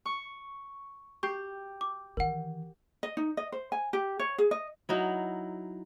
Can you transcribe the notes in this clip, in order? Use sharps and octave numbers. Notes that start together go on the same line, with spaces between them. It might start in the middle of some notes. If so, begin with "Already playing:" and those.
C#6
G4 C#6 G6 C7
D6
D#3 E3 A#4 F#5
D#5
D#4
D#5
C5
G#5
G4
C#5
G#4
D#5
F#3 D#4 E4